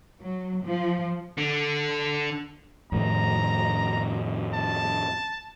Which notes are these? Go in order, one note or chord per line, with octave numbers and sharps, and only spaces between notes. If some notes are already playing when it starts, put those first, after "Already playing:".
F#3
F3
D3
F2 A2 D#3 A#5
A5